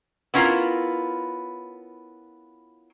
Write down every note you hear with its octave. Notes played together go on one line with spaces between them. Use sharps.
B3 C#4 E4 F4 A#4